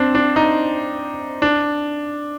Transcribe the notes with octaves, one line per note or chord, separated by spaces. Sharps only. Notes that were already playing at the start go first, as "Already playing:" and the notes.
Already playing: C4 D4
D4
D#4
D4